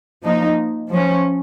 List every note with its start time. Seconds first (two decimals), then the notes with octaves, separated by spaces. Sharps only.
0.24 F3 A#3 D#4
0.89 F3
0.94 C#4